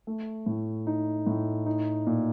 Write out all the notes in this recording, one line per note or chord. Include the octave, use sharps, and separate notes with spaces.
A3
A2
D#4
A2
D#4
A#2